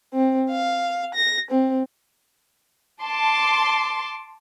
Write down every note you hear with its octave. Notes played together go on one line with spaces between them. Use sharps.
C4
F5
A#6
C4
A5 C6 D6